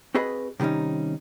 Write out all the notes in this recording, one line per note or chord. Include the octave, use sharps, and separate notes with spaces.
C4 F#4 G#4 B4 D#5 B5
C3 D#3 G3 C#4 D#4